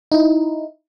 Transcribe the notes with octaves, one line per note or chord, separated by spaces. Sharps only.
D#4 E4